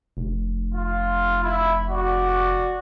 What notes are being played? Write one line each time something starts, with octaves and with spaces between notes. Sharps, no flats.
F1
F4
E4
F#4 D5